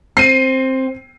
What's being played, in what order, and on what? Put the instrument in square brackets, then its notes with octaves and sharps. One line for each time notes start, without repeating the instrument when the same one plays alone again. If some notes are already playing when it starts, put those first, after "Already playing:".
[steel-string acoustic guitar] C4 [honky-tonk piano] C7 D#7